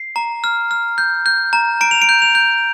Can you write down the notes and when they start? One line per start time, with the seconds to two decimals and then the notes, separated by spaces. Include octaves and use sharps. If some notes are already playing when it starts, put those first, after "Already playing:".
Already playing: C7
0.16 A#5
0.44 F6
0.71 F6
0.98 G6
1.26 G6
1.53 A#5
1.81 A#5 D7
1.91 F7
2.02 D7
2.09 G6
2.22 F7
2.35 G6